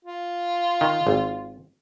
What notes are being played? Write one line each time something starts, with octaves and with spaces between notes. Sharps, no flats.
F4
D#3
G#1